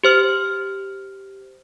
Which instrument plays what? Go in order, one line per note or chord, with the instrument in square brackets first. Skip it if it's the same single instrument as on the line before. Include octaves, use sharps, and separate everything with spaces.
[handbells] G4 C5 F6